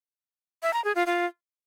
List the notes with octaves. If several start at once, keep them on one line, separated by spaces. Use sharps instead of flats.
E5
A#5
G#4
F4
F4